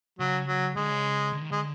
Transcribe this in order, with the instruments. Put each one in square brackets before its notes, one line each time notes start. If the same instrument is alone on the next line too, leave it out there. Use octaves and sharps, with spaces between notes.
[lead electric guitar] C#3 [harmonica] F#3
[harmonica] F#3
[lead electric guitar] D3 [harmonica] G#3
[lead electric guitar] C#3
D3
D#3
[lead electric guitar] D3 [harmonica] G#3